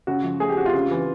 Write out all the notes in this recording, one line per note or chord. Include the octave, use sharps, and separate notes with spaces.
C#3 F#4
F3
A3 G#4
G4
C4 F#4
F4
C#3
E3